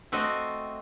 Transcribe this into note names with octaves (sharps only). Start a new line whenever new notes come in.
A3 C4 F#4 D#5